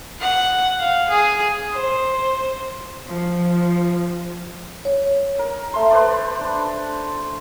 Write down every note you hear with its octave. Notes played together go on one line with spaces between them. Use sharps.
F#5
F5
G#4
C5
F3
C#5
A#4
A3 C6
B4 C5 D5
D4 C6